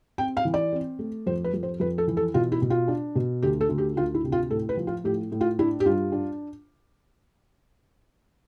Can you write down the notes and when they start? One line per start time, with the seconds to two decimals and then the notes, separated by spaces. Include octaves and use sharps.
0.18 C4 G5
0.37 F5
0.45 E3
0.54 D5
0.72 C4
0.99 A3
1.26 F2 C5
1.44 B4
1.54 F2
1.63 C5
1.80 F2 B4
1.98 A4
2.07 E3
2.17 A4
2.34 B2 F4
2.52 E4
2.62 B2
2.70 F4
2.88 D4
3.15 B2
3.43 D2 G4
3.61 A4
3.69 D2
3.78 G4
3.96 D2 F4
4.14 E4
4.24 C3
4.32 F4
4.50 A2 A4
4.69 B4
4.77 F3
4.87 F4
5.04 A2 G4
5.32 A2
5.41 F4
5.59 D4 E4
5.80 G4
5.86 G2 F4
6.12 D4